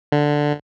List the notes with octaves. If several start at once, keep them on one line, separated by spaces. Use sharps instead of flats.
D3